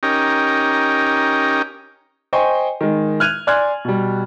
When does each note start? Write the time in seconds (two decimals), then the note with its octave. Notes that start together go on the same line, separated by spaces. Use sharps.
0.03 C#4 D#4 G4 A#4
2.33 C5 D#5 G5 G#5 C6 C#6
2.81 D#3 G#3
3.20 F6 F#6 G#6 D#7 F7
3.47 D5 G#5 C6 F6 F#6 G#6
3.85 B2 G3